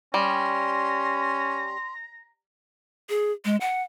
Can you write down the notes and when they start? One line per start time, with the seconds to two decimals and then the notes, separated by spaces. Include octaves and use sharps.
0.14 G3 C#4 A#5 C6
3.09 G#4
3.45 G#3
3.61 F#5